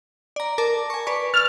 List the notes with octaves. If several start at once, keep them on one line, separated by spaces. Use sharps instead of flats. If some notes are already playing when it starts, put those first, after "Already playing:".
D5 A#5
A#4 A5 D6
G#5 C#6
B4 D5 C#6
F6 A6